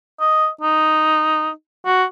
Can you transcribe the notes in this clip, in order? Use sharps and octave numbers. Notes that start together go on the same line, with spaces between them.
D#5
D#4
F#4